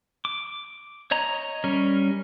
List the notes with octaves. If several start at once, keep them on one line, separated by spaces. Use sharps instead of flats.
D6
C#5 D#5 A#5
G3 C#4 A#4